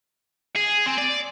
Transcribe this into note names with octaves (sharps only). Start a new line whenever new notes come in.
G#4
C4
D5